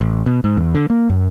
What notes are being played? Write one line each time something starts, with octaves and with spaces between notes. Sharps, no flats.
A1
B2
G#2
E2
D3
A#3
F#2